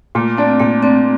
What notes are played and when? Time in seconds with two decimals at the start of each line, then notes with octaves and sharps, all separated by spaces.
0.15 A#2 A3
0.37 C4 D4
0.60 A#2 A3
0.82 C4 D4